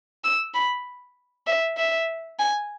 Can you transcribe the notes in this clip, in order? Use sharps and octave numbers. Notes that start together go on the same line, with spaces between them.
E6
B5
E5
E5
G#5